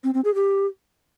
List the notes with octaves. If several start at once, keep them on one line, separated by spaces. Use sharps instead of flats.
C4
C4
G#4
G4